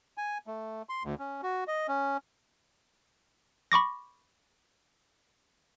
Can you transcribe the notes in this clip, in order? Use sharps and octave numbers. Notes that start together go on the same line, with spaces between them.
G#5
A3
C6
D2
C#4
F#4
D#5
C#4
B5 C#6 D6 A#6